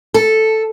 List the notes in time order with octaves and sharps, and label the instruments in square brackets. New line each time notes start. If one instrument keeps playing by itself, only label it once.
[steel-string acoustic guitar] A4